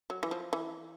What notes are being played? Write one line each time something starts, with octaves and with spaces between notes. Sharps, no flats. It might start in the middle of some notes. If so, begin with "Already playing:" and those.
F#3
E3
F3
E3